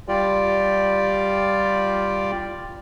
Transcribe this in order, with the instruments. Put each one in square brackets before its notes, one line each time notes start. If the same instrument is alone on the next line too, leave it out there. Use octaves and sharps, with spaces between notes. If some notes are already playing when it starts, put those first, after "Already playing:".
[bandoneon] G3 F4 G4 D5